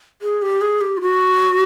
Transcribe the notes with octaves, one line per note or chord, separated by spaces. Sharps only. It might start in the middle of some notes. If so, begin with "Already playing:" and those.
G#4
G4
G#4
G4
F4
F#4